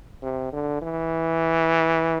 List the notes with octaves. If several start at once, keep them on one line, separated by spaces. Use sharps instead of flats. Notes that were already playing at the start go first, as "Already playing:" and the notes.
C3
D3
E3